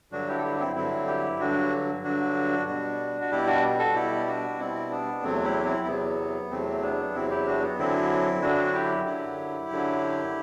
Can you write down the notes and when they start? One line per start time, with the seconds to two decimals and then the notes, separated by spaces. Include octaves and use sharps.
0.12 G2 D3 F#3 D4 F#4
0.28 E4 G4
0.38 A4
0.44 E4 G4
0.59 C4 E4
0.76 G2 D3 F#3 C4 E4
1.08 E4 G4
1.39 G2 D3 F#3 D4 F#4
2.03 G2 D3 F#3 D4 F#4
2.67 B2 G3
3.21 F#4
3.31 B2 G3 E4 G4
3.47 D4 F#4
3.79 F#4 A4
3.95 B2 G3 E4 G4
4.27 D4 F#4
4.59 B2 G3 C4 E4
4.91 B3 D4
5.22 E2 C3 F#3 A3 C4
5.44 E4 G4
5.65 C4 E4
5.86 E2 C3 F#3 B3
6.51 E2 C3 F#3 A3 C4
6.82 B3 D4
7.14 E2 C3 F#3 C4 E4
7.30 E4 G4
7.46 D4 F#4
7.62 B3
7.78 F#2 D3 F#3 C4 E4
8.42 F#2 D3 F#3 D4 F#4
8.73 E4 G4
9.06 F#2 D3 F#3 E4 G4
9.70 F#2 D3 F#3